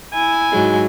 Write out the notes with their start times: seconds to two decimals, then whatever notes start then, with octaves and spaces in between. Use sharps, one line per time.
0.13 E4 G#5
0.51 G#2 F#3 G#3